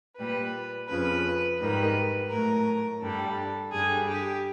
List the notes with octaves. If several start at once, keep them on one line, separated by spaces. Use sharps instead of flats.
A#2 G3 B4
F2 C#3 F3 B4
G#2 D#3 G3 B4
A2 F#3 A#4
G2 D3 G3 A4
G2 D3 G3 G#4
G4